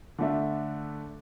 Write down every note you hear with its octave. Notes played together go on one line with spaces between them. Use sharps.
D3 A3 D4 A4 E5